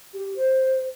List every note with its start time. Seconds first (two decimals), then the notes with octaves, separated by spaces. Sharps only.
0.14 G4
0.36 C5